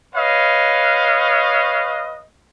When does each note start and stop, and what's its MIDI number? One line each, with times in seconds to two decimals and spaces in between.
0.15 2.22 71
0.15 2.22 73
0.15 2.22 75
0.15 2.22 77